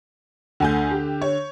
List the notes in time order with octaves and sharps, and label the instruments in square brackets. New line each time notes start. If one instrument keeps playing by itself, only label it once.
[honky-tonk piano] D2 G#5 G6 [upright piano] D3
[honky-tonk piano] G4
C#5